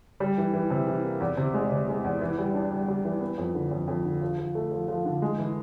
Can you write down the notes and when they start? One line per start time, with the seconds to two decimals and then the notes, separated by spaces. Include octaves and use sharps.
0.20 G3
0.38 E3
0.53 E3
0.70 C3
0.88 E3
1.05 A#3
1.20 E2
1.37 C3
1.54 G#3
1.71 C3
1.88 G#3
2.04 E2
2.21 E3
2.38 G3
2.54 D4
2.72 G3
2.88 G3
3.05 E3
3.21 B3
3.38 F2
3.55 D3
3.71 F2
3.88 F2
4.05 D3
4.21 F3
4.38 F3
4.55 A3
4.72 F3
4.88 F3
5.05 D3
5.22 G#3
5.38 E3